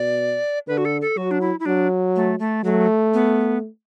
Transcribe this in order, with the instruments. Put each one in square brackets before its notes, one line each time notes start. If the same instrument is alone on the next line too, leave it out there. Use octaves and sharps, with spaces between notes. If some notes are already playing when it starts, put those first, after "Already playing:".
Already playing: [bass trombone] B2 [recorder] D5
[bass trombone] D3 [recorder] B4
[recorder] F#4
A4
A4
[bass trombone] F#3 [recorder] F#4
[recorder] D4
E4
E4
[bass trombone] F#3 [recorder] D4
[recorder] A3
A3
[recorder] F#3 [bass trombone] A3
[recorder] B3